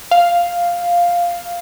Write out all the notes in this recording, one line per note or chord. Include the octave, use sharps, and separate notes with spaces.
F5